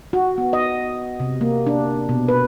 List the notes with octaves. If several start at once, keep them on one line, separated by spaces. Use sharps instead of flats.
F#4
B3
D#5
C3
A#3
D4
B2
B4